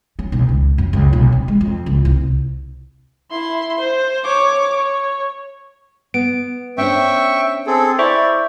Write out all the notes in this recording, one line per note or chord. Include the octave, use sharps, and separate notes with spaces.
C#4
B1
C#2
F#2
C#2
B1
C4
G#3
F2
C#2
C2
E4 C6
C5
C#5 D6
C#5
B3 D7
C#4 D4 C5 E5 G5 C#6
C4 G#4 A4
E4 C5 D5 E5 C#6